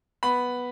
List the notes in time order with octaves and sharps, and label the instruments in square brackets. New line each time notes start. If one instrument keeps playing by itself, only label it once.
[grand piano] B3 B5